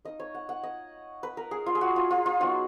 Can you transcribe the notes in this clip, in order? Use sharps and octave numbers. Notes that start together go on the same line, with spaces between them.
A#3 D#4 D#5
C#5
F#5
F#5
D#5
B4
A#4
G#4
F4
G#4
F#4
F4
F4
F4
F#3 B3 D#4 F#4